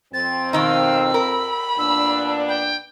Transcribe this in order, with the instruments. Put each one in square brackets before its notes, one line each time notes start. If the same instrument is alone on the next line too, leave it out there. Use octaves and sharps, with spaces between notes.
[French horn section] F2 C4 [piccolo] A6
[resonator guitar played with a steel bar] B2 D#3 D#4 [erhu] F5 [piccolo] E6
[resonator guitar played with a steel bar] A#4 [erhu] B5
[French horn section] A#2 B3 D4 [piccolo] E6
[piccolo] G5